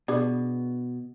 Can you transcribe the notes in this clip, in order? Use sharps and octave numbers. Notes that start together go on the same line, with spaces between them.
B2 D4 G#4 B4